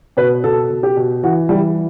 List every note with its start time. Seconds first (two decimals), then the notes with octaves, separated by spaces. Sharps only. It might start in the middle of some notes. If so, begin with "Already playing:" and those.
0.17 B2 B4
0.44 B2 A4
0.70 B2
0.83 G4
0.97 B2
1.23 E3 F#4
1.49 E3 G3